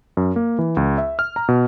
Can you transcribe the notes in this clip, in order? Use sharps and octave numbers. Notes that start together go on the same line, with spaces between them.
F#2
A#3
E3
C#2
E5
F6
A#5
B2